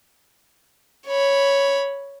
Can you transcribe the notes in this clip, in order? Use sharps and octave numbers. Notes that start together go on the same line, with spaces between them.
C#5 B5